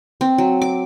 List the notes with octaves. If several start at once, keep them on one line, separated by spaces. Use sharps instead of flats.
C4
F#3
D6